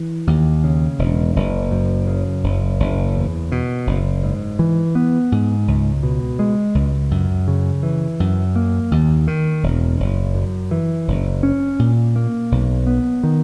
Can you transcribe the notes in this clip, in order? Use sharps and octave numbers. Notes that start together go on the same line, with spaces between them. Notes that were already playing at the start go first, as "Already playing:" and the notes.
Already playing: E3
D#2
C#3
E1
F#1
F#2
C#3
F#1
F#1
E2
B2
F#1
G#2
E3
B3
G#2
C#2
B2
G#3
C#2
F#2
C#3
E3
F#2
A#3
D#2
D#3
E1
F#1
F#2
E3
F#1
C#4
A#2
A#3
B1
B3
D#3